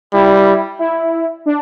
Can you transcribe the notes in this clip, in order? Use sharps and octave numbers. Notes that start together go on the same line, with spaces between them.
G3 E4
E4
D4